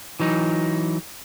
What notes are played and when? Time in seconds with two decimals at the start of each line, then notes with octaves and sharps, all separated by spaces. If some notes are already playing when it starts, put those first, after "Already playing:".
0.20 E3 F#3 D#4